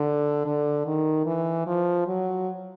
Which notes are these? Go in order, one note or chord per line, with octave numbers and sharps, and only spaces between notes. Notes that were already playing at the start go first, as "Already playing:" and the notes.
Already playing: D3
D3
D#3
E3
F3
F#3